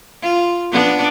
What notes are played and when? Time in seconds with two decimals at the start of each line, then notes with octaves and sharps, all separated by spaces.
0.22 F4
0.72 B3 D4